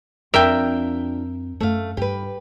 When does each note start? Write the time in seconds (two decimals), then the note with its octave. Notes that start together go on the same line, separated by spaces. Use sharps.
0.34 F2 C4 D4 F4 A#4 E5 G5
1.60 F#2 A3 F5
1.97 G2 G4 B4